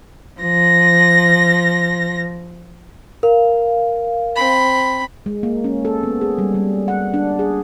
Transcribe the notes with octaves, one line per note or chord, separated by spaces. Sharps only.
F3 A#6
A#4 F5
C4 B5
G#3
A#3
C#4
A4
B3
G#4
G3
G3
F#5
D4
G#4